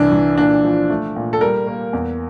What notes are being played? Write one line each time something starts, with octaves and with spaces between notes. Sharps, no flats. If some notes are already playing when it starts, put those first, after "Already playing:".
Already playing: C2 E3 D4
E3
A#2 D4
F3
A3
A#2
A4
G3 A#4
A#3
E2